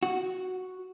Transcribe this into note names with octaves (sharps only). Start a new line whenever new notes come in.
F#4